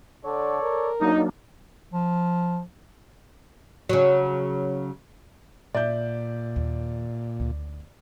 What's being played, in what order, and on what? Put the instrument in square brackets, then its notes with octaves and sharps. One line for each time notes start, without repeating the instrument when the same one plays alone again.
[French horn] D3 [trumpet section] A4 C#5 D5
[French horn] A#4
[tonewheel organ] F#3 A#3 D4 [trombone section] D#4
[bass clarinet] F3
[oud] C#3 F#3
[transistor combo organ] A#2 [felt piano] D5 E5 G6
[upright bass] D#2
D2